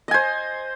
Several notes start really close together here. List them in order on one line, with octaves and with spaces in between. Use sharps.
D#5 G#5 C5